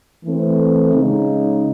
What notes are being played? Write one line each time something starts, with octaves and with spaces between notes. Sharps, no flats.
E3 A3 C4
C#3 G#3 D#4